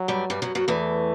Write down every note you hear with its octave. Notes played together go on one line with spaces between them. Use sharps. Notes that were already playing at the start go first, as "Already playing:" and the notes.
Already playing: F#3
G2 G3
G2 G3
F#2 F#3
F#2 F#3
E2 E3 A3